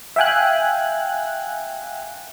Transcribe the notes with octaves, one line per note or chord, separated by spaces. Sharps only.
E5 F5 G5 G#5 F#6